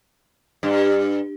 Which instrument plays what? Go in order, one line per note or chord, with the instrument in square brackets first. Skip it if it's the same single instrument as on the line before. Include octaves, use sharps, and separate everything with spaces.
[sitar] G2